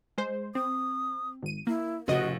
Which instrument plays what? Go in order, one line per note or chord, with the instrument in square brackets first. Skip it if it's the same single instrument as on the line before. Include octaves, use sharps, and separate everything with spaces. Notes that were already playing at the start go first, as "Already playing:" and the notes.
[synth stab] G#3 C5
[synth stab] C4 [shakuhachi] D#6
[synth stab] G#1 D#7
[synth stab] A#3 [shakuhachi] E4
[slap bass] F1 A2 [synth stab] C#3 D#5 [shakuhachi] F#4